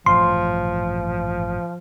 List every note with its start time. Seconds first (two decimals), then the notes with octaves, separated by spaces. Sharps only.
0.06 A1 G2 A#2 F3 C6